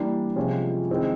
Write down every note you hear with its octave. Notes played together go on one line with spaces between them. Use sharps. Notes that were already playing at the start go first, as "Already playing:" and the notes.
Already playing: E3 G3 A#3 D4
C3 F3 G#3 C#4 F4
D#3 G#3 C4 E4